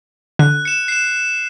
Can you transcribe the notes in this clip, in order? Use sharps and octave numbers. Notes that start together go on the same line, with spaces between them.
D3 F#6
C#7 E7
C7 E7